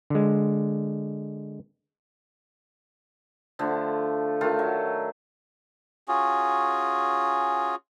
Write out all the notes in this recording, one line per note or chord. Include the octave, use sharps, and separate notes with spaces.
D3 G#3
D3 F3 A3
D#3 A3 F4
F#3
C#4 F4 F#4 G#4